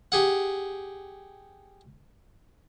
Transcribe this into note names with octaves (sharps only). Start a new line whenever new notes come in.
G4 G#4 F#5